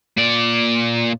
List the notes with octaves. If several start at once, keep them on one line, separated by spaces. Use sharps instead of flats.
A#2 D5